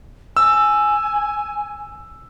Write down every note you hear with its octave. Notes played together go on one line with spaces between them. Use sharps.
G#5 E6